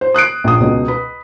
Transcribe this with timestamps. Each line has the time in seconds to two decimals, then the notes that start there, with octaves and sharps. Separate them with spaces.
0.01 C5
0.14 D#6 F#6 C7 D7
0.44 A#1 D#6
0.60 C#2 B2
0.88 B4